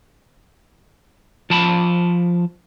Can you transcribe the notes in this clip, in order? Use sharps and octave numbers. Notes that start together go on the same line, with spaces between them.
F3 A5 B5